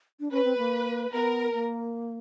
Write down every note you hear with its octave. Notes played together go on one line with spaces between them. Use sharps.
D4
C#4 B4
C4
A#3
B3 A#4
A#3